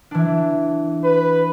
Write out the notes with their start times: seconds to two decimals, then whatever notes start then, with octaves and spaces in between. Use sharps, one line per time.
0.11 E3 D4
1.04 B4